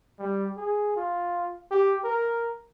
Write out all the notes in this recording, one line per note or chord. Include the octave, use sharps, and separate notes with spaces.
G3
G#4
F4
G4
A#4